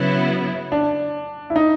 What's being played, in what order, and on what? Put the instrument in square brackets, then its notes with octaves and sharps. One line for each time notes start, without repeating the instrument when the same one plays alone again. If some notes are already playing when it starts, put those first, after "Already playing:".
Already playing: [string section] C#3 F#3 B3 E4
[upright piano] D4
E4
D#4